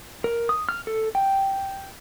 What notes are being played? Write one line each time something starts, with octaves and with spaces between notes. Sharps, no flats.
A#4
D#6
F6
A4
G5